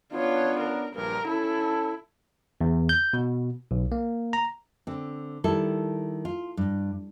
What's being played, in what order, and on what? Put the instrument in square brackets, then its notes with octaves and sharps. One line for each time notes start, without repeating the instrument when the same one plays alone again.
[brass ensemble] B3 C#4 D4 [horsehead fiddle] F4 C#5
[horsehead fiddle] A#4
[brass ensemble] A#1 G2 [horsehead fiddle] A#4
[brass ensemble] C#4 A4 A5 [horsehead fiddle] E4
[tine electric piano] E2
G6
B2
B1
A#3
A#5
[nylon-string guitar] D3 C4
D#3 G3 E4 A4
F4
G2